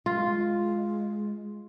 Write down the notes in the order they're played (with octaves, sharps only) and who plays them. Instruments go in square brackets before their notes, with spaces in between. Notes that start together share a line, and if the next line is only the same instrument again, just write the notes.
[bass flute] G#3 [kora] F4